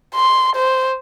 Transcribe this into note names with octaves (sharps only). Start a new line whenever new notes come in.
C6
C5